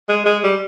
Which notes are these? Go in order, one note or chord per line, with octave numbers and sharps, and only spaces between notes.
G#3
G#3
G3